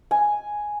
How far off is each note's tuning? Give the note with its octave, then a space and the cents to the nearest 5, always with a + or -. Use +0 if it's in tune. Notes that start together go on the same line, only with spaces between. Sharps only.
G#5 +0